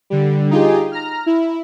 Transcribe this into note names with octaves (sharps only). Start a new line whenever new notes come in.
D3 G3
D#4 F4 G4 G#4
A#5 F6
E4